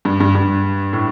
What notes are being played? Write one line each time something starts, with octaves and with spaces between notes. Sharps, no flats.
G2
G2
G2
A2